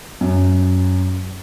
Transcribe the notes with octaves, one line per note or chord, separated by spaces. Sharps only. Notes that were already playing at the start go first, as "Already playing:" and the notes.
F#2